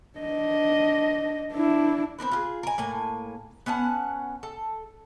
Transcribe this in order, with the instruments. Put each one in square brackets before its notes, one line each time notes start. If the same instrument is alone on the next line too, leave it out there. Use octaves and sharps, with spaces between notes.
[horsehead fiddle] D4 D#5
D4 E4
[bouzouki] C4 D#4 A#4 B4
F4 G4 G#4
A#4 G#5
A2 A#3 G#5
B3 C#4 F#5 A5
A4